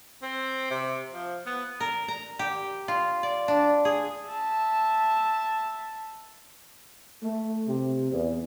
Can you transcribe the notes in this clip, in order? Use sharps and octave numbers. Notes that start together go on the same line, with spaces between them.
C4
C3
F3
B3
A#4
A#5
G4
F4
D5
D4
G#4
E5 A5
A3
C3
E2